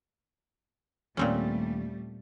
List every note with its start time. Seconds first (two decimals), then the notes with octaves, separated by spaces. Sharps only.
1.17 D#2 A#2 G3 A3 C4 C#4